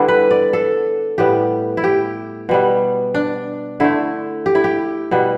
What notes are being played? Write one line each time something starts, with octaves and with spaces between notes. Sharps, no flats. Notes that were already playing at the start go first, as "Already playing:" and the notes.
Already playing: D3 G3 B3 D4 E4
B4
D5
A4
A2 G3 B3 G4
E4
G4
B2 G3 B3
D4
D3 A3 E4
G4
E4
G4
B2 G3 B3